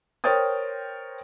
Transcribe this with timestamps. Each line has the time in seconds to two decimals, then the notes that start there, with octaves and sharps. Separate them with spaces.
0.24 A#4 C5 C#5 G5 D#6 A6